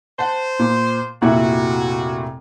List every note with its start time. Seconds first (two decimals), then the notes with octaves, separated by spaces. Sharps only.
0.19 C5 F#5 A5
0.59 A#2
1.22 F1 A#2 E4 F#4